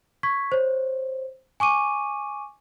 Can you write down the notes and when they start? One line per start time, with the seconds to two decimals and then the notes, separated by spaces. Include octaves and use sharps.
0.23 C#6 G#6 B6
0.52 C5 C#5
1.60 G#5 C#6 D6 D#7